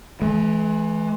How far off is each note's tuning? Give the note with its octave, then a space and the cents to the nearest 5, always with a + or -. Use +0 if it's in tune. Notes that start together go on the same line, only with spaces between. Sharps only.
E3 +0 G#3 +45